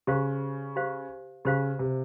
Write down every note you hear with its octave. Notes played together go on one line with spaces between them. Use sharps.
C#3 G4 C5 F5
G4 C5 F5
C#3 G4 C5 F5
C3